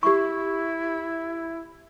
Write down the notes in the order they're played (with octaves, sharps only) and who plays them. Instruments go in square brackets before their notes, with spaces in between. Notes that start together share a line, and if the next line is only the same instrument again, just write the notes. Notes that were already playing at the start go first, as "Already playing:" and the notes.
[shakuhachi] E4 [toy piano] G4 C#6